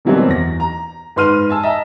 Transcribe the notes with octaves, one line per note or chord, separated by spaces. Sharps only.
B2 E3 F#3 G3 A#3 C4
E2 A#6
A#5
G#2 B4 C6 F6 D#7
G#5 A5 E6
D#5 E5 A5 A#5